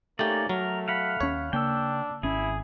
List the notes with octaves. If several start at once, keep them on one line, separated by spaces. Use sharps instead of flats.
A3 A#3 C#4 D#4 G4 D5
F#3 A3 A#4
F5 F#5 B5
D#2 C#4 C#5
C#3 A#3 D4 G5 E6
G#1 C#4 E4 G#4